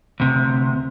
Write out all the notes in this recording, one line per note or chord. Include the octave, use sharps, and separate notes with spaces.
D2 C3